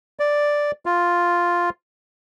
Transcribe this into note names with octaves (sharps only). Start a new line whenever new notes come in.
D5
F4